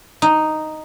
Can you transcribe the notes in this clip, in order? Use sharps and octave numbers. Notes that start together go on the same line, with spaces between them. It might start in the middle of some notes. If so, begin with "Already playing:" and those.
D#4